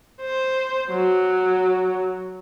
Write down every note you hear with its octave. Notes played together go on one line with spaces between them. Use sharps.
C5
F#3